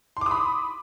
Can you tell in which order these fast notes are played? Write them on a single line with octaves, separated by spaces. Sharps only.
C6 D6 D#6 B5